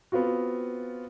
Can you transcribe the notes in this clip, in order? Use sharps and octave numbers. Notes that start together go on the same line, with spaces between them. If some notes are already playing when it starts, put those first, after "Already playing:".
B3 C4 F4 F#4